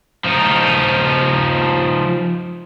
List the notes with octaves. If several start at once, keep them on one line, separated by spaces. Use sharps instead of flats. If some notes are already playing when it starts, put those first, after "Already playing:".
F3 D#4